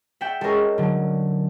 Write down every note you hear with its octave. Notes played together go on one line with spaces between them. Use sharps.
D5 E5 F#5 G5
G#3 C#4 A4 A#4
D3 F#3